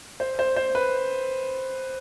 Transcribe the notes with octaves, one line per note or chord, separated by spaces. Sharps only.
C5
C5
C5
B4